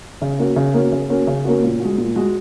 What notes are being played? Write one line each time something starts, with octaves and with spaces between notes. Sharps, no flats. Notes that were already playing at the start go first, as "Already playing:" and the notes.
C#3
A#3 C#4 F#4
C#3
A#3 C#4 F#4
C#3
A#3 C#4 F#4
C#3
A#3 C#4 F#4
A#2
G#3 F#4
A#2
G#3 F#4